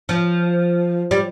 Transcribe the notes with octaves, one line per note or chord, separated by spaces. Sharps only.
F3
G3